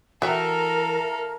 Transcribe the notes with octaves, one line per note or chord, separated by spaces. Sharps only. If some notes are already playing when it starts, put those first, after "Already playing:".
E3 F#4 A4 A#4 E5 F5 G5